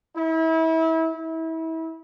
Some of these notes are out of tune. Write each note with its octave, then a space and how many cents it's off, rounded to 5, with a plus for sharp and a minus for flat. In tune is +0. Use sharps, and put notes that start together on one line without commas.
E4 -30
E4 -30